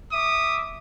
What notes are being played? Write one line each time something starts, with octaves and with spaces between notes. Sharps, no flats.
E5 D6 D#6